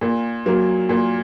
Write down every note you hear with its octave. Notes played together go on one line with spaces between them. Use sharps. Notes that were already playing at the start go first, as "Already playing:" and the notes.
A#2
F#3 A#3
A#2